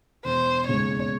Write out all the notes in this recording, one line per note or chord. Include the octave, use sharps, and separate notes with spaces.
E1 C5
D#2 C#3 G#3 C#5